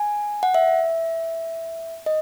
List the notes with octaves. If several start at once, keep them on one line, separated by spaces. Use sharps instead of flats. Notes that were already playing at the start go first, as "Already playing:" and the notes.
Already playing: G#5
F#5
E5
D#5